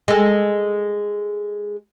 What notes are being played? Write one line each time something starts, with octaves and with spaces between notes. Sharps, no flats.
G#3 A4